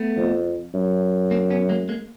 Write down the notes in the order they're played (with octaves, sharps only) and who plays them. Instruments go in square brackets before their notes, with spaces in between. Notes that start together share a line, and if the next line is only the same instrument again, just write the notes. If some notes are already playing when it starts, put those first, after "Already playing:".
Already playing: [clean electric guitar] A3 B3
[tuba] F2
F#2
[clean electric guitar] A#3 C4
B3 C#4
G#3 A#3
G#3 A#3